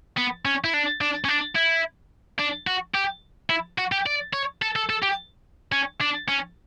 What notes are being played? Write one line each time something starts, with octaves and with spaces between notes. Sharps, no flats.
B3
C#4
E4
D4
D4
C#4
D4
E4
D4
F#4
G4
E4
F#4
G4
D5
C#5
A4
A4
A4
G4
C#4
D4
C#4